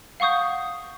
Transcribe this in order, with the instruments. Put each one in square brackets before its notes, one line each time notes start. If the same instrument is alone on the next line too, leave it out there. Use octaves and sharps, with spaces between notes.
[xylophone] F5 F#5 C#6 D#6 G6